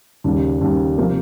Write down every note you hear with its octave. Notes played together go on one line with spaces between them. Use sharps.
D#2 C#3 G3
D#2 C#3 G3
C3 F3 A#3